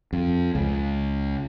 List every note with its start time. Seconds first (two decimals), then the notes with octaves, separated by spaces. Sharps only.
0.13 F2
0.55 C#2